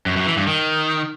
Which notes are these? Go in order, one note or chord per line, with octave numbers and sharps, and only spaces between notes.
F#2
F#2
E3
G2
D#3